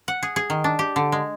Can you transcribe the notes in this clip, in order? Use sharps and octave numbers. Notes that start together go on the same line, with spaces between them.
F#5
G#4
G#4
D#3
D4
G4
D3
G#3